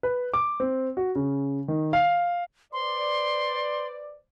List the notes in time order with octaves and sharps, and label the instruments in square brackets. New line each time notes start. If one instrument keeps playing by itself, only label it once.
[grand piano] B4
D6
C4
F#4
C#3
D#3
F5
[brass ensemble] B4 C5 D5 [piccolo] C6